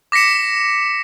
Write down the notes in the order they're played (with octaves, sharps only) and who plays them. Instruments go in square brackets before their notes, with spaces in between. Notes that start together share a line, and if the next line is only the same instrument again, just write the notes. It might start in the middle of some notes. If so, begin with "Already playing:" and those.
[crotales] D6 A#6 B6 C#7 E7